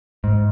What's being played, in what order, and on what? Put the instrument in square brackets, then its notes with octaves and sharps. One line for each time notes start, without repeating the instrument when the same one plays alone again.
[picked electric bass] G#2